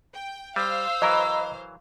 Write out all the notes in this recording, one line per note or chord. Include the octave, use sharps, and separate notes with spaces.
G5
G3 C5 F5 E6
E3 F#3 A#4 D#5 A#5 B5